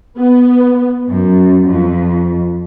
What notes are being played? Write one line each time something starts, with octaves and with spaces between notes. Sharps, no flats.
B3
F#2
F2